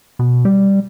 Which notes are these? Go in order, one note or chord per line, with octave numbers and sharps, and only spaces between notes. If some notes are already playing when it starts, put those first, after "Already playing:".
B2
G3